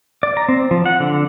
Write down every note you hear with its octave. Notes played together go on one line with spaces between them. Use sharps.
D5
A#5
C4
F3
F#5
D3